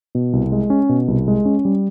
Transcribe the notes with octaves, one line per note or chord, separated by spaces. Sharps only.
B2
C2
G#3
C#4
B2
C2
G#3
C#4
G3